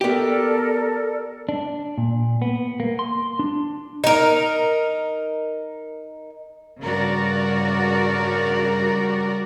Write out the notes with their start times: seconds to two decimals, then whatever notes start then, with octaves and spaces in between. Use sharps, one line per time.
0.01 B3 G4 A4 A#4 D5
1.49 D4
1.98 A#2
2.42 B3
2.80 A#3
2.99 C6
3.39 D4
4.04 D#4 A#4
6.82 G2 C#3 F#4 A#4 D5